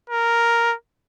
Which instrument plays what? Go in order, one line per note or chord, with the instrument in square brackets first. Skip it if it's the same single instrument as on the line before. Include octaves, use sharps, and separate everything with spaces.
[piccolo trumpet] A#4